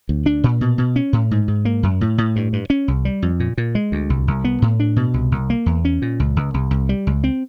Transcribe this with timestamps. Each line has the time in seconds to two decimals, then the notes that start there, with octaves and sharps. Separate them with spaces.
0.09 D2
0.26 D4
0.44 A#2
0.61 B2
0.78 B2
0.96 C#4
1.13 A2
1.31 G#2
1.48 G#2
1.65 A#3
1.83 F#2
2.01 A2
2.18 A2
2.36 G2
2.53 G2
2.70 C#4
2.88 C2
3.05 G3
3.22 F2
3.40 A#2
3.58 A#2
3.75 G#3
3.92 D2
4.10 C2
4.28 C2
4.44 B3
4.62 A2
4.80 D4
4.96 B2
5.14 C2
5.32 C2
5.50 A#3
5.66 E2
5.85 C#4
6.02 A#2
6.20 C#2
6.36 C#2
6.54 C2
6.71 C2
6.89 G3
7.07 C#2
7.24 C4